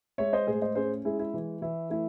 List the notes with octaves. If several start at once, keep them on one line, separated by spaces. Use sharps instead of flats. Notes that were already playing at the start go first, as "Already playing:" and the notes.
G#3 C#5 E5
C5 D#5
A2 G#4 C5
C5 D#5
C#4 G#4 C5
G#3 E4 G#4
E4
E3
E3 E4
A3 E4